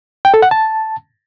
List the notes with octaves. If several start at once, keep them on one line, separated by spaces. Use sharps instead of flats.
G5
A4
F#5
A5